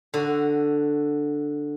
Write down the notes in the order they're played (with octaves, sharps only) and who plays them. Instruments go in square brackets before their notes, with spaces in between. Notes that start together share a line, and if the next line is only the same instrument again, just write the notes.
[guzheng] D3 F#4